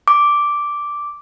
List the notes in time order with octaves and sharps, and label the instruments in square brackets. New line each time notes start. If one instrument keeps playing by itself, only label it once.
[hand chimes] D6